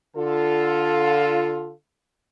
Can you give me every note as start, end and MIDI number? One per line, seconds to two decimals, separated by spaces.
0.16 1.71 50
0.16 1.71 65
0.16 1.71 69